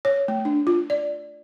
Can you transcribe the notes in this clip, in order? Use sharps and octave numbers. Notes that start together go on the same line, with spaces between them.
C#5
A3
D4
F4
D5